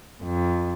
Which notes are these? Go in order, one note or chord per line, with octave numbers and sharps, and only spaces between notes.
F2